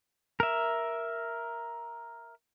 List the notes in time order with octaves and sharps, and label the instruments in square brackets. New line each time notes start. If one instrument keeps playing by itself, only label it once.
[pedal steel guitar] A#4 E5